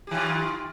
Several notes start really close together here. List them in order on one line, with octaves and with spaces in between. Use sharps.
G4 D#3 F4